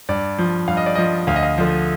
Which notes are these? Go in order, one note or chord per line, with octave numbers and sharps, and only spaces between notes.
G2 D5
F3
G2 F5
D#5
D5
F3 D#5
D2 F5
D#5
F5
D3 F3